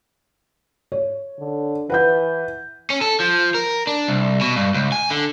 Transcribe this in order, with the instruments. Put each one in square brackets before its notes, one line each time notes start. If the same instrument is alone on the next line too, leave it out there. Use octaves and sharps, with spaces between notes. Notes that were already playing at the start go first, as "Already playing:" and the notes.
[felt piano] C#5
[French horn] D3
[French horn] E3 [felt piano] B4 F#5 G6
[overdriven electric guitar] C#4
A4
F3
A#4
D4
C2
B2
G2
C#2
G#5
D3